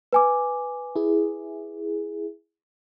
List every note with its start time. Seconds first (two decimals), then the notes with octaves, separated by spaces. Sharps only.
0.13 B4 G#5 D6
0.96 E4 G#4